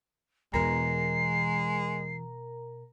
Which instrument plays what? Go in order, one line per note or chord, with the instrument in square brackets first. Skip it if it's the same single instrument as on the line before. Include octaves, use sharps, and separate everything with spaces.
[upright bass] E2 E3 [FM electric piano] B2 A#4 A#5 [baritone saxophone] G#3 [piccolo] C7